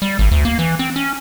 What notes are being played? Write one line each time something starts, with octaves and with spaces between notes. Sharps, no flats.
G3
G#1
D2
A#3
E3
C4
C#4